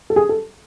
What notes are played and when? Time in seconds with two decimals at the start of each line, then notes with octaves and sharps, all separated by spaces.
0.10 A4
0.16 G#4
0.29 A4